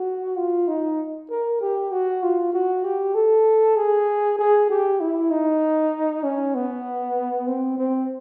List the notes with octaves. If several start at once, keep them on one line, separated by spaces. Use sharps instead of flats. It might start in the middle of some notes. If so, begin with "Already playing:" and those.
Already playing: F#4
F4
D#4
A#4
G4
F#4
F4
F#4
G4
A4
G#4
G#4
G4
E4
D#4
C#4
B3
C4
C4